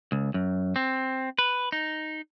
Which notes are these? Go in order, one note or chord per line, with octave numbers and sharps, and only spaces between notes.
C#2
F#2
C4
B4
D#4